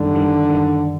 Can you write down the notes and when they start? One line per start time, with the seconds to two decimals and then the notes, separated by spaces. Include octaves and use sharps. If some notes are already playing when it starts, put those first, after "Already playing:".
Already playing: F#2 D3 D#3 G3
0.13 F#2 D#3 G3
0.50 F#2 D#3 G3